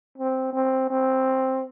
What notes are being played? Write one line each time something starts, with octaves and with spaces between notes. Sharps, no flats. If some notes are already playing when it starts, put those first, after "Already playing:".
C4
C4
C4